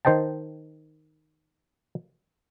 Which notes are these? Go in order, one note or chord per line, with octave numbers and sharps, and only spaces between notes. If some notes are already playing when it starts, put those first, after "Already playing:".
D#3 C5 D#5 G5 A5